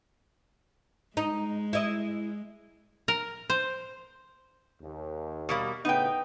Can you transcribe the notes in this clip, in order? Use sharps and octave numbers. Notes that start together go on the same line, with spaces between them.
G#3 D#4
E4 D#5
A#4
C5
D#2
B2 G3 A#3
A2 C#3 B3 D#4 G5